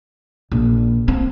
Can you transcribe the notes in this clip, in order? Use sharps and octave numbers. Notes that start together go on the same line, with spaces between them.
A#1
C4